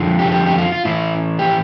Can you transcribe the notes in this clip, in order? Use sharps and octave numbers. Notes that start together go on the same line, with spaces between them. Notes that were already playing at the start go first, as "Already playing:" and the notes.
Already playing: F2 D3 F3
G4
G4
G4
F4
F4
A2 E3 E4
G4